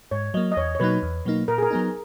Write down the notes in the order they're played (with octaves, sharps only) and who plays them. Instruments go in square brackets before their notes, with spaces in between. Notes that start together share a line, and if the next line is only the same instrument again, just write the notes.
[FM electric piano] G#2 [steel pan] C#5
[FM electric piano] F#3 A#3 [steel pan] D#5
[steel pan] D#5
[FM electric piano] E2 [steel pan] C#5
[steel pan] C#5
[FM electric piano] B2 F#3 A#3 D#4 [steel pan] B4
[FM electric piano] E2
B2 F#3 A#3 D#4
[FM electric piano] A#2 [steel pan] A#4
[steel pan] G#4
A#4
[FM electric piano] F#3 B3 D#4